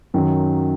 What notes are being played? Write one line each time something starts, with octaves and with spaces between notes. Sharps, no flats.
F#2 D#3 F#3